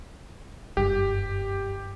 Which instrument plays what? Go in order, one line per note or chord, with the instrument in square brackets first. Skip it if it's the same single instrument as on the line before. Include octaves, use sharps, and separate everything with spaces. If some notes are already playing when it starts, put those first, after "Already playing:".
[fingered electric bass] F#1 G2 [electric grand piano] G4